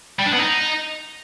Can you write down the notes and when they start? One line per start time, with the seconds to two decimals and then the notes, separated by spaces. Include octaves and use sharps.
0.19 G3
0.26 D4
0.33 B3
0.40 D#4